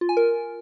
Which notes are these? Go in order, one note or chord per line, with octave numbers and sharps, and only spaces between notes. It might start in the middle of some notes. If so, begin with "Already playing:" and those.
F4
G#5
A#4